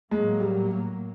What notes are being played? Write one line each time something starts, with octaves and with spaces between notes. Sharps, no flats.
A2 F#3 G#3 A#3
G3